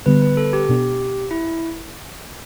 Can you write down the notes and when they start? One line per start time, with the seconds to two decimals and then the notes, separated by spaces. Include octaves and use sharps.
0.06 D3 G3 B3 B4
0.22 B4
0.37 A4
0.53 G4
0.69 B2 B3 D4
1.31 E4